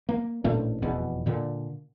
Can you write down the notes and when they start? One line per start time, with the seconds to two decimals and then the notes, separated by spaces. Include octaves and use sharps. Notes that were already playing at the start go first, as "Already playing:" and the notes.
0.09 A#3
0.44 A1 A#2 A3 D4
0.82 F1 E2 B2
1.26 A#2 D3